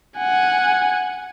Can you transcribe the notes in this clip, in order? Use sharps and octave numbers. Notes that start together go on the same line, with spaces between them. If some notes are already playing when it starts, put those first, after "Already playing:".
F#5 G#5